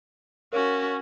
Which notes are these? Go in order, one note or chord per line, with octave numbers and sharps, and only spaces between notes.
C#4 F#4 A#4 C#5 F5